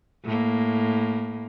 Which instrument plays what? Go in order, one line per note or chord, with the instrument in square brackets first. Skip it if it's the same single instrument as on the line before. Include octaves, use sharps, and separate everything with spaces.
[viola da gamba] A2 A#3